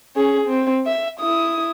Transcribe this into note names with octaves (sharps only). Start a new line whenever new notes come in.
C#4 G#4
C4
E5
E4 D#6